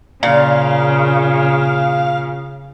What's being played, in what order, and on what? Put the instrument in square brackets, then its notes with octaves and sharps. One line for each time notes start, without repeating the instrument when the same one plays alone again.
[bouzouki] A#2 [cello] C#3 [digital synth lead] F5